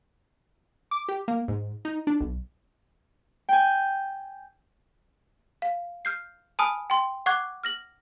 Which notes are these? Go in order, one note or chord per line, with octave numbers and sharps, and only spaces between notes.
D6
G4
A#3
G#2
D#4
D4
B1
G5 G#5
F5
F6 G6 C7
G#5 A5 B5 D#6 F6
G5 C6
F#5 C#6 D6 F#6 G#6
F6 A#6 F#7